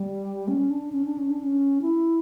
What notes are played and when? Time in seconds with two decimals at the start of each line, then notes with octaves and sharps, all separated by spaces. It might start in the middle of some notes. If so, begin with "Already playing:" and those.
Already playing: G3
0.48 C#4
0.70 D4
0.92 C#4
1.05 D4
1.18 C#4
1.31 D4
1.43 C#4
1.82 E4